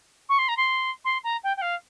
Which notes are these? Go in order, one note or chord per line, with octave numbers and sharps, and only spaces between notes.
C#6
C6
A#5
C6
C6
A#5
G5
G5
F5